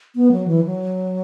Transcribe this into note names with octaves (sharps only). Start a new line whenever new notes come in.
B3
F#3
E3
F#3